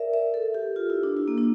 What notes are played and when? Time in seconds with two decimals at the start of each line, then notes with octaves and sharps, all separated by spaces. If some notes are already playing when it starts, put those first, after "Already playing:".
Already playing: A#4 D5 E5
0.14 E5
0.34 A4
0.54 G4
0.76 F4
0.90 E4
1.03 D4
1.17 E4
1.28 A#3
1.38 D4